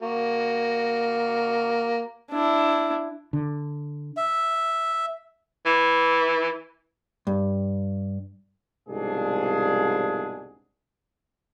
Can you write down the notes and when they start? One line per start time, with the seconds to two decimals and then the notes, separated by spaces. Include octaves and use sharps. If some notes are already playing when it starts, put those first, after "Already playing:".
0.02 A#3 F#4
2.31 D4 E4
3.33 D3
4.17 E5
5.66 E3
7.27 G2
8.88 C2 G#2 B2 F3 D4 G#4